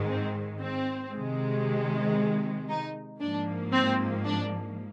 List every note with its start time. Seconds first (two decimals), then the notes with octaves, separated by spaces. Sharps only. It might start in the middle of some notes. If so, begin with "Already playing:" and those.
Already playing: G#2 D#3 G#3
0.08 C4
0.60 C4
1.12 C3 D#3 G#3
2.69 D#4
3.20 G#2 F3 A#3 D4
3.72 C4
4.25 D4